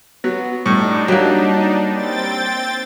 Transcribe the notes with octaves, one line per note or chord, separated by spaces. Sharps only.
F#3 B3
A2 G3 D4 D#4
F#3 A#3 G4
C4 G5 A6